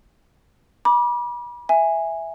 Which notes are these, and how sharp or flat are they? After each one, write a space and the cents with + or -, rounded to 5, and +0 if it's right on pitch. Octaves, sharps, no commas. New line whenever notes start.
B5 -40 D6 +0
E5 +0 G#5 -10